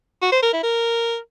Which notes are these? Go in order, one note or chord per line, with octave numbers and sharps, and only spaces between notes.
F#4
C5
A#4
E4
A#4